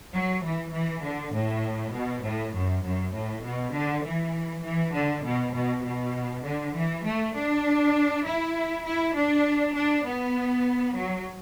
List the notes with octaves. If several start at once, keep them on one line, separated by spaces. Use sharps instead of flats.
F#3
E3
E3
D3
A2
B2
A2
F#2
F#2
A2
B2
D3
E3
E3
D3
B2
B2
B2
D3
E3
A3
D4
E4
E4
D4
D4
B3
F#3